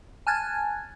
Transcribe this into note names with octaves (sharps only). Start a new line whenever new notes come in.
G#5 A5 F6 F#6 G#6 A6